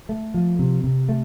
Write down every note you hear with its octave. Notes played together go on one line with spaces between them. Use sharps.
A3
F3
C3
C3
A3